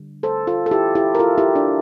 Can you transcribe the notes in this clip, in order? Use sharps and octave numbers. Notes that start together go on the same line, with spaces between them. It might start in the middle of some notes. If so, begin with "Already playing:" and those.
Already playing: D3 G3
A4 C5
F4 A4
A4
E4 G4
E4 G4
A#4
F4 A4
E4 G4
D4